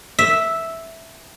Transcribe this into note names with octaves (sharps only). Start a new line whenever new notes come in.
E5